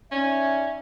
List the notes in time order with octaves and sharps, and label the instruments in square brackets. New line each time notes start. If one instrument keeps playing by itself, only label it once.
[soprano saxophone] C#4 [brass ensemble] D#4 D5 E5